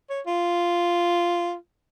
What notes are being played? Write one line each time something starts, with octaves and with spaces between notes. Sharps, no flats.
C#5
F4